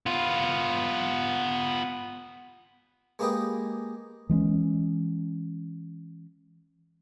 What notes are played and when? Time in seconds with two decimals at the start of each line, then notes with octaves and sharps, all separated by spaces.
0.06 B3 F4
3.19 G#3 A#3 G4 B4 D#5 G5
4.29 E3 G#3 A#3 C#4